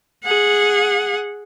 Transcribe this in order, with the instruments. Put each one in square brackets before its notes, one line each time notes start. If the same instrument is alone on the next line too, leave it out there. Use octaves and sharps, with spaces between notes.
[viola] G#4 F#5